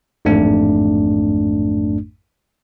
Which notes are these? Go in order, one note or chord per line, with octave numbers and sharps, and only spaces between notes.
A1 F2 G#2 A3 D4